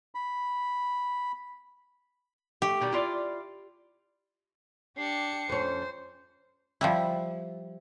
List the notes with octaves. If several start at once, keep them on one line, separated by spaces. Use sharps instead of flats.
B5
A3 G4
B2 D#3 G3
E4 F4 D5
D4 G4 C7 C#7
F2 C#4 C5
F3 G3 E4